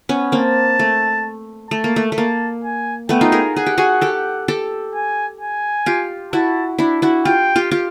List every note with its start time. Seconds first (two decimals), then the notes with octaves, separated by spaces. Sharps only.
0.09 B3 C#4
0.32 A#3 C4 A5
0.79 A3
1.71 A3 A5
1.84 A#3
1.96 A3
2.12 A3
2.17 A#3 A5
2.64 G#5
3.09 A3 B3 G5
3.21 D#4 F4
3.32 G#4 A#4
3.56 G#4 F#5
3.66 G4
3.78 F#4 G#4
4.01 G4 A4
4.48 G4 A4
4.94 G#5
5.40 G#5
5.86 F4 G4
6.33 E4 F#4 A5
6.78 D4 E4
7.02 E4 F#4
7.25 F4 G4 G5
7.56 F4 G4
7.71 F4 G4